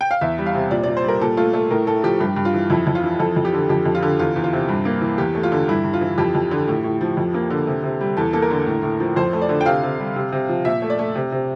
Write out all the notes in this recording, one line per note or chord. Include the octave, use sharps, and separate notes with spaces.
G5
F5
E2 E5
G3
F5
C3
A#2 D5
A#2 D5
C5
G3 A#4
A#2 A4
A3 F4
A3 A4
A2 A#4
A2 A4
F3 G4
G2 G4
G2
F4
E3
F2 E4
F2
F4
E3
F2 A4
F2
G4
D3
F2 G4
F2
F4
D3
E2 F4
E2
F4
C3
G2
A#3
E3
E2 G4
A3
F4
D3
G2 E4
G2
F4
E3
F2 G4
F2
D3
A2
A2
F3
F2
A#3
D3
C3
C3
G3
E2 A4
A#3 A4
A#4
D3
A2
A2
F3
F2 C5
A3
D5
D3
G5
C3 F5
C3
G3
C3
C3
F3
A#2 E5
A3
D5
A3
C3
C3